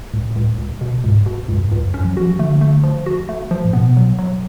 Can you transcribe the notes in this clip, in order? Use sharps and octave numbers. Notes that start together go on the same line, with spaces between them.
C#2 A2
C#2
C#2
B2
C#2 G#2
B2
C#2 F#2
G#2
C#2
F#2
F#2 C#4
F3
F3 F#4
F3
D3 A3
A3
F3
F#4
A3
F3
A2
B2 B3
F#3
F#3